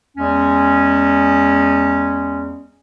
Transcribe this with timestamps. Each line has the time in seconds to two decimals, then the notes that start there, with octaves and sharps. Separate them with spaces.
0.17 E2 G#3 C#4